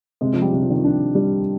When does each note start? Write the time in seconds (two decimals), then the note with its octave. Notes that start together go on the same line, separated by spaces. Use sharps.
0.21 C3 G#3
0.33 F3
0.42 G3
0.53 C3
0.62 F3
0.70 D#3
0.77 F3
0.84 D4
1.15 G3